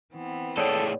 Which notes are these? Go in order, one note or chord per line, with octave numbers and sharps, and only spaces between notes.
E3 B3 C4
A2 G#4 A4 C#5 D5 G5